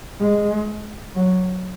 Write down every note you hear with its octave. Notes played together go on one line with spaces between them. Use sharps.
G#3
F#3